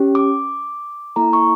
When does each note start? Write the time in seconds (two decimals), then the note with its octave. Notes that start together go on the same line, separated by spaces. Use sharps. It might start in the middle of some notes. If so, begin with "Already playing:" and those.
Already playing: C#4 G4
0.15 D6
1.16 A#3 E4 A4 A#5
1.33 C#6